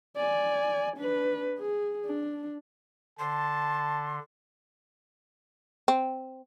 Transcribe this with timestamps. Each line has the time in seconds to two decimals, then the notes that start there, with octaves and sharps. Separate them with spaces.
0.16 D5 G#5
0.97 D4 B4
1.59 G#4
2.06 D4
3.19 D3 A5 C6
5.88 C4